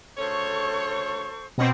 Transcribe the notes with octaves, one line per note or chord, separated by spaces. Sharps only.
D2 C#3 A4 C5 C#5 C#6
B2 C4 F#4 C#5 D#5